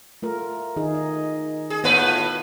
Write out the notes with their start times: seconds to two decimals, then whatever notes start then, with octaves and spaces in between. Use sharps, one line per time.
0.22 A3 F4 A#4
0.76 D#3 D#4 G#4
0.95 D#5
1.70 G#4
1.84 A2 B3 F4 B4